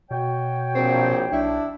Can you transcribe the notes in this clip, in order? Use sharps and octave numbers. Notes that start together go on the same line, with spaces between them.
B2 F#4 C#5 G5
A#1 C4
B1 D4 E4